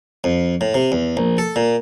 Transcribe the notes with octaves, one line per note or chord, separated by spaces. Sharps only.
F2
A2
C3
E2
A#1
A4
A#2